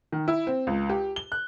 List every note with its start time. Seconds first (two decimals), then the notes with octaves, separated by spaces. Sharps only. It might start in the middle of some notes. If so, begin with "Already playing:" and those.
0.12 D#3
0.28 E4
0.47 C4
0.67 C#2
0.89 G4
1.16 G7
1.32 F#6